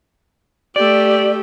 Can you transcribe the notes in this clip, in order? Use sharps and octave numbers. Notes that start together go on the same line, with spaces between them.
A3 G4 D5